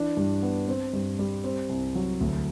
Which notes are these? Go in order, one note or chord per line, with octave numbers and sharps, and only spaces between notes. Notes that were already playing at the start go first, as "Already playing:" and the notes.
Already playing: E3 D4
G2
B3
C4
G2
G3
C4
C2
F#3
D2